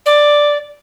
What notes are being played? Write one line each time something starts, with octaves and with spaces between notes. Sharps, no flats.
D5